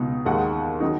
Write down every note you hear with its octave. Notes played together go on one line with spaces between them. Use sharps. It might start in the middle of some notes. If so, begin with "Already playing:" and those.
Already playing: C#2 B2 B3 D#4
D#2 D#3 G#3 F#5
D#3 F#3 D#4